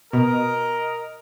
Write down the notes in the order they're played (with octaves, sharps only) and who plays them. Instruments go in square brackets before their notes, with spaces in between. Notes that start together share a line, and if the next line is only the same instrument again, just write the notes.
[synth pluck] B2 [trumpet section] A#4 D#5